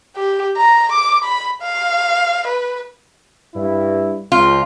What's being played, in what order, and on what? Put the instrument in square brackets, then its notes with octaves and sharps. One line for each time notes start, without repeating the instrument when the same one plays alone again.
[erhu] G4
A#5
D6
B5
F5
B4
[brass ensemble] G2 E4
[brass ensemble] C#2 [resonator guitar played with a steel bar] F4